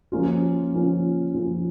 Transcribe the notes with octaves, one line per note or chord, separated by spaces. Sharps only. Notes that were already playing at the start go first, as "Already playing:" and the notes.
F3 A#3 C#4 F4
F3 A#3 C#4 F4
F3 A#3 C#4 F4